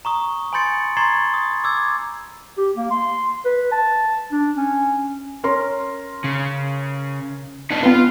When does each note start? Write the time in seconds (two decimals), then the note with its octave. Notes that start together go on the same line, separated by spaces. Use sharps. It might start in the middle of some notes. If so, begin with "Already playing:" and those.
0.05 A#5 C#6 D#6
0.53 G#5 B5 C6 G6 A6 C#7
0.97 A#5 C6 C#6 G#6 A6 C7
1.34 D#6
1.64 D6 E6 G#6
2.57 G4
2.76 A#3
2.91 C6
3.45 B4
3.72 A5
4.32 D4
4.57 C#4
5.43 C#4 A#4 C6
6.24 C#3
7.71 B3 D4 D#4
7.83 B3 F4 B4